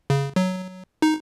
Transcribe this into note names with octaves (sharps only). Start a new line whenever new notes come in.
C#3
F#3
D#4